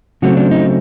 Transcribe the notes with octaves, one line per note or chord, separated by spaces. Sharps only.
C#3 F#3 A3 C4 F#4
D4
D#4